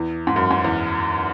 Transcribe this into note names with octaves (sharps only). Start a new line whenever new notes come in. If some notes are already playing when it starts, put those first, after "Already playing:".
Already playing: E2
G#2
F#2
G#2
E2